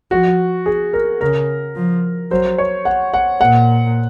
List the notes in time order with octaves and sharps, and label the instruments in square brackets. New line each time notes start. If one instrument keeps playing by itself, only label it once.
[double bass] F3 [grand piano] F#4
[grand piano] G#4
A#4
[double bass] C#3 [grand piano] A#4
[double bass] F3
[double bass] F#3 [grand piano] C5
[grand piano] C#5
F#5
F#5
[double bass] A#2 [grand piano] F#5